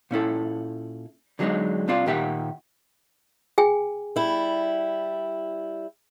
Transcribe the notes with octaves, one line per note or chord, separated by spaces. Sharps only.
A#2 C#4 E4 A4
D3 F#3 G#3 A#3 D4 D#4
C2 C3 D4 F4 D5
A#2 D#3 G4 E5 F#5
G#4 G5 G#5
G3 E4